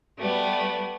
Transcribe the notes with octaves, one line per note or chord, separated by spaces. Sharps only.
G3 A3 B3